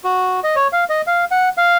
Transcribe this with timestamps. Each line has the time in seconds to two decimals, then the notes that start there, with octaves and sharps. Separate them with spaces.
0.04 F#4
0.44 D#5
0.56 C#5
0.73 F5
0.90 D#5
1.07 F5
1.31 F#5
1.57 F5